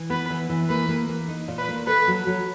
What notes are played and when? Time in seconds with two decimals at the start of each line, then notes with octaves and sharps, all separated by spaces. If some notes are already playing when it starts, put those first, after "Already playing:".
Already playing: E3
0.10 B3 B4
0.30 E3
0.49 E3
0.69 A#3 B4
0.88 A#3
1.09 A#3
1.28 D#4
1.48 A#2
1.58 B4
1.68 A#3
1.87 A4 B4
2.07 F#3
2.27 F#3